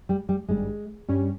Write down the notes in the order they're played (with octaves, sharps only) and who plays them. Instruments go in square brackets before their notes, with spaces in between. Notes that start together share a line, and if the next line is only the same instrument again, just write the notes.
[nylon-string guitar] G3
G3
[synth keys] G#1 G2 G3 [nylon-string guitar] G#3
[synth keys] G2 G3 C#4